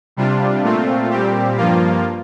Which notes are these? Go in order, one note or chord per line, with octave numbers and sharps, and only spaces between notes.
C3 G3 D4 F4
A#2 A3 C4 F4
A#2 G3 C4 G4
G2 F3 A#3 F4